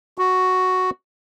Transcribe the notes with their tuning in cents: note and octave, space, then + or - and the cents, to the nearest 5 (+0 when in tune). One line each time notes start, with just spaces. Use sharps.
F#4 +0